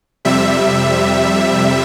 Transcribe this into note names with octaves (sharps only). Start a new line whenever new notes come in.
F2 C3 G3 E5